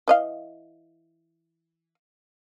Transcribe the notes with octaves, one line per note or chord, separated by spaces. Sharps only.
E3 D#5 F5